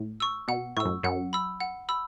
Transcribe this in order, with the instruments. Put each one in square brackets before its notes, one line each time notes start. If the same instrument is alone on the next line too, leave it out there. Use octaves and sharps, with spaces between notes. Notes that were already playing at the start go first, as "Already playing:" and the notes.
Already playing: [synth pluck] A2
[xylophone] C#6 E6
[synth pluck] B2 [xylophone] F#5
[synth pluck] A2 [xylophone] C#6 E6
[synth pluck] F#2
[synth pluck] F#2 [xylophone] F#5
[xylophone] B5 E6
F#5
B5 E6